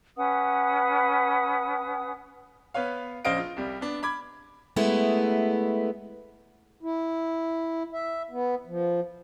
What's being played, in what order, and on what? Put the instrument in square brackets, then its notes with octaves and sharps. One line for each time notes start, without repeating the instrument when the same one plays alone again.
[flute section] C#4 B4 F#5 D#6
[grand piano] B3 B4 C#5 F5
A#1 C#3 C5 D#5 F5 D7
F4
C2 G3
B3 D4
B5 D6 G#6
[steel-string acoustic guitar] G#3 A3 B3 E4
[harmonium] E4
E5
B3
F3